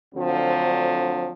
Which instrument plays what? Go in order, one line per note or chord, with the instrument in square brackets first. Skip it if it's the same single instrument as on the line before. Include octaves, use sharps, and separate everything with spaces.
[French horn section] D2 D3 F3 F#3 C4